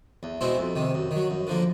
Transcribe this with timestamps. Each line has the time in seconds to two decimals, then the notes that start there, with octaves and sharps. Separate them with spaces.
0.23 E2
0.41 B2 G#3 C4 E4
0.58 F2
0.75 C3 D#3
0.94 F#2
1.11 D#3 F#3
1.30 F#2
1.47 D3 F3 A#3